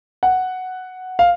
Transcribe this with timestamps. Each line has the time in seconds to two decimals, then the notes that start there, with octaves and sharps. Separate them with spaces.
0.23 F#5
1.19 F5